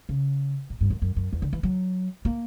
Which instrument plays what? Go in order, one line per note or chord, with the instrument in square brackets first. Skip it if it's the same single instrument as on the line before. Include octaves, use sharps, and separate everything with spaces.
[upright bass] C#3
A#2
G2
F#2
F#2
F#2
E2
D3
E3
F#3
A#3